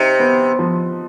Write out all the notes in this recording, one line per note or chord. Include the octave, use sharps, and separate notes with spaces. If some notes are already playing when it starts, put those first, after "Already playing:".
Already playing: C3 D#4
B3
F3